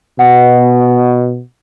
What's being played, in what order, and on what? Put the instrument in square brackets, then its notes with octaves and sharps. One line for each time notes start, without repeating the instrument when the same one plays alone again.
[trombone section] B2 [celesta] F#5